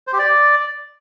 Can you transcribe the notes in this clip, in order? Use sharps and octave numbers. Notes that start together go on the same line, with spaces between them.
C5
G4
D5